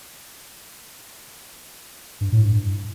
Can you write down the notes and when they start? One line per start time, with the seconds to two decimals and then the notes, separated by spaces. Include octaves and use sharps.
2.21 G2
2.32 A2
2.44 G2